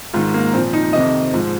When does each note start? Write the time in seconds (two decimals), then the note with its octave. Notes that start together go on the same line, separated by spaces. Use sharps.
0.13 G#2 D#3 F4
0.34 A#3
0.53 A#2 F3 C4
0.73 D#4
0.93 F2 C3 D#3 D#5
1.33 G#2 F3